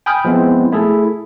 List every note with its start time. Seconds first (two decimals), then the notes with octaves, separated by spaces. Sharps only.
0.06 G5 G#5 B5 D#6 F6 G6
0.25 F3 G#3 B3 C4 E4
0.72 A3 E4 G#4 A4